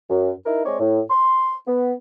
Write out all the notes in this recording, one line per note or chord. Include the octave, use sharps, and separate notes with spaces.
F#2
D#4 E4 A#4
G#3 C4 C#5 D5
A2
C6
B3